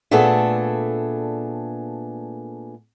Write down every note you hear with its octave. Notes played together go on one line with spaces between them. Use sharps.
A#2 A3 B3 D4 G#4 A4